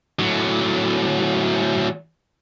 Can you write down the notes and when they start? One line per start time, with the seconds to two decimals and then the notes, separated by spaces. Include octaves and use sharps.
0.19 A2 F#3